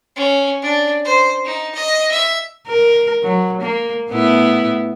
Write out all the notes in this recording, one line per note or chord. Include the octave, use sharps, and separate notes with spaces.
C#4
D4
C5
D#4
D#5
E5
A#4
F#3
A#3
A2 B3 E4